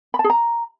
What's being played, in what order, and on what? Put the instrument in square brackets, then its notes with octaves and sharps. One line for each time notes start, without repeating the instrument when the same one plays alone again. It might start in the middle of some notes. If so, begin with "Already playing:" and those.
[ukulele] B5
A5
G#4
A#5